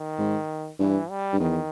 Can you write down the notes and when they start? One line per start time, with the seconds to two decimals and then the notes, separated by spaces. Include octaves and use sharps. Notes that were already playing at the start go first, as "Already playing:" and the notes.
Already playing: D#3
0.18 G#2
0.79 G2 E3
1.10 G3
1.33 G2
1.40 E2 D#3